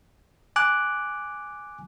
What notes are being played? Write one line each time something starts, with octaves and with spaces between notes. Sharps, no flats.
G#5 D6 F#6